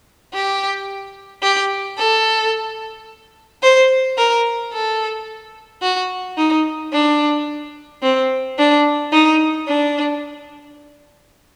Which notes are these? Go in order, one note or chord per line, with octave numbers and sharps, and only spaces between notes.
G4
G4
A4
C5
A#4
A4
F#4
D#4
D4
C4
D4
D#4
D4